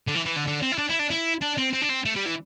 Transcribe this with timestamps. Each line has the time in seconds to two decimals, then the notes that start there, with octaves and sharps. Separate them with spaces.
0.07 D3
0.14 E3
0.25 E3
0.36 D3
0.47 D3
0.62 C4
0.72 E4
0.78 D4
0.89 E4
0.99 D4
1.10 E4
1.42 D4
1.58 C4
1.73 C4
1.82 D4
1.89 C4
2.06 A3
2.15 G3
2.26 E3